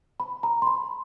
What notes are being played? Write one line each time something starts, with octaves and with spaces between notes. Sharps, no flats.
B5
A#5
C6
B5